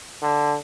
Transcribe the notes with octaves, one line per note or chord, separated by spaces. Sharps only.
D3